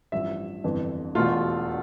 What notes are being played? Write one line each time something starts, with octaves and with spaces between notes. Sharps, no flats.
A1 G2 F3 E5
G1 F2 E3
E1 E2 B2 A3 F4